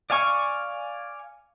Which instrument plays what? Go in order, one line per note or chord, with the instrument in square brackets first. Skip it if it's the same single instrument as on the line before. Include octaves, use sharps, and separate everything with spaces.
[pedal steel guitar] D5 F5 G#5 C#6